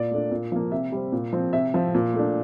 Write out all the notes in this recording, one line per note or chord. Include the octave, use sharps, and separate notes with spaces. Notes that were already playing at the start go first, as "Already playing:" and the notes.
Already playing: A#2 D5
A3 D4
A#2
F3 A#3
C3 E5
G3 C4
A#2
F3 C4
C3 E5
F3 C4
A#2
A3
D4